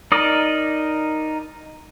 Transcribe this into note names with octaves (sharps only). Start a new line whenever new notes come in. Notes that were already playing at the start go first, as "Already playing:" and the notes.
D#4 A#4 D5 D#5